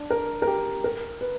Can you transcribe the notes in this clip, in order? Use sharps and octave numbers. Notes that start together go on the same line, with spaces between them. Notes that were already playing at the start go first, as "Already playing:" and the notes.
Already playing: D4
A#4
A#4
G4
A#4
B4